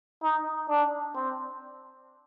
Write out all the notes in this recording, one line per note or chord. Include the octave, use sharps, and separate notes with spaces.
D#4
D4
C4